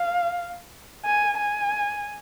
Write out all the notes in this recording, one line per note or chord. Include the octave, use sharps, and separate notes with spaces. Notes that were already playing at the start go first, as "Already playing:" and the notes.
Already playing: F5
G#5
G#5